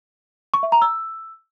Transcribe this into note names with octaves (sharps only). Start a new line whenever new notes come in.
C#6
E5
A#5
E6